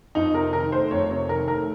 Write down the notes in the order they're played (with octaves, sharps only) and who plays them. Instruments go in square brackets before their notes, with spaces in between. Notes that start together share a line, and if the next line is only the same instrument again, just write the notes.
[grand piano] F2 [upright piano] D#4
[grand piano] C3 [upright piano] A#4
[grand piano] D#3 [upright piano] A#4
[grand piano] A3 [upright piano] C5
[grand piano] F2 [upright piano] C#5
[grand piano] C3 [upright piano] C#5
[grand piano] D#3 [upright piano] A#4
[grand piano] A3 [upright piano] A#4